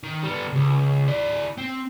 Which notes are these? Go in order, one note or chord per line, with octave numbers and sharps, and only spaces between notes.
D#3
G3 B3
C#2
E4 D5
C4